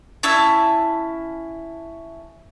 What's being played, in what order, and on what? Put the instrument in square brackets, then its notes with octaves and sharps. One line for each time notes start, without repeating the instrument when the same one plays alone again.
[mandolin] C#4 E4 A5 E6